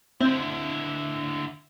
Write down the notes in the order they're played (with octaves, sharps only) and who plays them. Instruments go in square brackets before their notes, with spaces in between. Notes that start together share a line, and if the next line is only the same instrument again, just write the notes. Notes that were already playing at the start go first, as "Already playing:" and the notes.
[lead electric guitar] D3 E4 [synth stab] C4